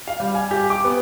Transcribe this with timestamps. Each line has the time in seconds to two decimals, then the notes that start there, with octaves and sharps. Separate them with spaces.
0.08 F5
0.20 G3
0.35 G#5
0.51 G4
0.70 D6
0.84 B3